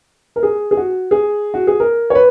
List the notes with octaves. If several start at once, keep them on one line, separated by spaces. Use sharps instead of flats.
A#4
G#4
G#4
F#4
G#4
F#4
G#4
A#4
C#5
B4